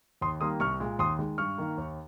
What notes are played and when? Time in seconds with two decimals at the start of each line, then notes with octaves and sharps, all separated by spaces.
0.21 D#2 C6 D#6
0.41 D#3 G3 A#3 C6 D#6
0.60 C2 C#6 F6
0.80 A#2 G#3
0.99 D#2 C6 D#6
1.19 D#3 G#3
1.38 G2 C#6 F6
1.58 D#3 A#3
1.78 D#2